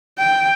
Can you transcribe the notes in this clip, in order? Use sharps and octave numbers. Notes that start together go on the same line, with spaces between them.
G5